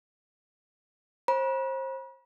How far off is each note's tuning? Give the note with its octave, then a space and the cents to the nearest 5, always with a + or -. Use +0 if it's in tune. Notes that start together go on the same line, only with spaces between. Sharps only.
C5 +30 B5 -45